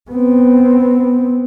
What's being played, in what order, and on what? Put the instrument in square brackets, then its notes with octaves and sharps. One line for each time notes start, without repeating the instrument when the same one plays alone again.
[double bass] B3 C4